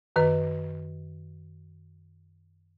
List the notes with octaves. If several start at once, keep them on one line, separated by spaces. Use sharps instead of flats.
F#2 D#3 B4